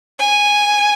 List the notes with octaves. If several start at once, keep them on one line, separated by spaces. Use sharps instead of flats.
G#5